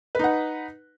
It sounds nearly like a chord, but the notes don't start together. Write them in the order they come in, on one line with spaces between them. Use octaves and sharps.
B4 D#4 F#5